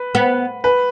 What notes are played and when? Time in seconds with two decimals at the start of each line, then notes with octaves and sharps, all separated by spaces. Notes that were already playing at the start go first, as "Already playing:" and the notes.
Already playing: B4
0.15 B3
0.64 B4